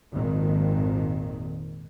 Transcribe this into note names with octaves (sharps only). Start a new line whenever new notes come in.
G#1 F2 A#2 D#3